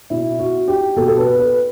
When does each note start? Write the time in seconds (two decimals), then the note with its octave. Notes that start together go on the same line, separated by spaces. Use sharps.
0.10 B2 E4
0.39 F#4
0.68 G4
0.96 B2 A4
1.08 A4
1.18 B4
1.40 B4